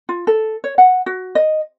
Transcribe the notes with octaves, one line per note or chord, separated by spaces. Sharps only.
F4
A4
C#5
F#5
F#4
D#5